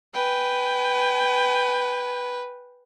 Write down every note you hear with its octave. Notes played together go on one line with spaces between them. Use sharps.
B4 G5 G#5